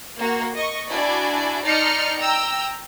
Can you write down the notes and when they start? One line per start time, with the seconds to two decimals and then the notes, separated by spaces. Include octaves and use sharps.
0.19 A#3 F#4
0.55 D#5 C#6
0.90 D4 E4 F#4 D5 G#5
1.63 D#4 D5 A5 C6 F6 C#7
2.17 G5 A#5 E6